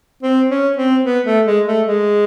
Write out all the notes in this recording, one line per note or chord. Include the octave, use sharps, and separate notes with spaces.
C4
C#4
C4
B3
A3
G#3
A3
G#3